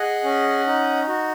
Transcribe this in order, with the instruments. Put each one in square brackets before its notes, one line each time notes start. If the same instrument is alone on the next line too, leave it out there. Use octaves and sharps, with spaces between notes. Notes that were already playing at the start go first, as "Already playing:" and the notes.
Already playing: [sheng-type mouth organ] G#4 D#5 F#5
C#4
D#4
F#4